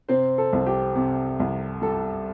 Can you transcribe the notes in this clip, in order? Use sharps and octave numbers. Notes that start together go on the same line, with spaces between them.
C3 C4 C5
A4
C2
G4
C3
C2
G3 A4